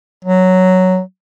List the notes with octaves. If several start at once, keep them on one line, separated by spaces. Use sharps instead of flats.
F#3